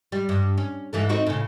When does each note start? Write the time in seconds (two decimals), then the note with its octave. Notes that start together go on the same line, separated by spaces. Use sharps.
0.12 G3
0.29 G2
0.58 C#4
0.93 G#2 E3 A3
1.09 C4 D#4 F#4
1.26 A2 C#3